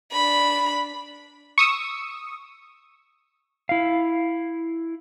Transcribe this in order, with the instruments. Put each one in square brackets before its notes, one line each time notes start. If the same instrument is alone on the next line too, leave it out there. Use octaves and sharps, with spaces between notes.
[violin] D4 B5
[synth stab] C#6 D#6 E6
[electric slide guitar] E4 F5